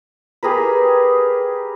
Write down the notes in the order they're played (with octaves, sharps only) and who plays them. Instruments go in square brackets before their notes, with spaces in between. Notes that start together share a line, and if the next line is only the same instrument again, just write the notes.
[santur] G4 G#4 A#4 B4